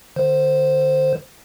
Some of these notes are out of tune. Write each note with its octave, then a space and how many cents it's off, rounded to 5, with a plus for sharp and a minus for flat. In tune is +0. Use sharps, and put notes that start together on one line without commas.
D3 +35 C5 +0